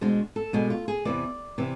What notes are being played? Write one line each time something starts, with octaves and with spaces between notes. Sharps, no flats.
B2 G#3 D4 C5
A4
B2 G#3 D4 G#4
F4
G#4
E2 C3 E3 D5
C3 E3